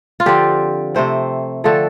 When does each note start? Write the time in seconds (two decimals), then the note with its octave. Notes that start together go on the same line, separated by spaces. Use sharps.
0.20 F4
0.26 D3 F3 C4 G4
0.95 C3 A3 C4 C5
1.64 D3 F3 A3 C4 A4